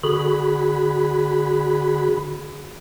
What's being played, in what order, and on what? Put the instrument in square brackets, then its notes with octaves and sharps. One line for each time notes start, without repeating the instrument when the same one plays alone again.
[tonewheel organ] D3 F#4 G#4 B5